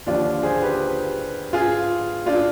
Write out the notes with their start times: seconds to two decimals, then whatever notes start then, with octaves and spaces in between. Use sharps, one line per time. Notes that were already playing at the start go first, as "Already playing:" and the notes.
0.07 D#2 D3 F3 D4 F4
0.43 G#4 C5
0.62 G4 B4
1.53 F4 G#4
2.26 D4 F4